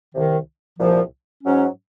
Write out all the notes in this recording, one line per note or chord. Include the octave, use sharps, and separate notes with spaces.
C2 C3 D#3
C2 A#2 F3
G#2 F#3 C#4